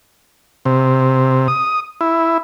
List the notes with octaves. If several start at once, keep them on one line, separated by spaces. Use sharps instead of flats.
C3
D#6
E4